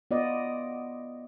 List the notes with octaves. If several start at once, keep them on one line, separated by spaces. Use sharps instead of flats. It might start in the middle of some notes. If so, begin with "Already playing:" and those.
B3 F4 D5 D#5